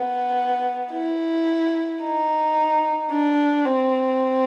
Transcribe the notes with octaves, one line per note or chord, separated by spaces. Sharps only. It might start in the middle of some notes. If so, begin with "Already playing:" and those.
Already playing: B3
E4
D#4
D4
C4